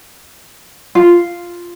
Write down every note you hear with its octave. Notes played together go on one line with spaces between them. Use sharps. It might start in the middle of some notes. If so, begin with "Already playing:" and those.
F4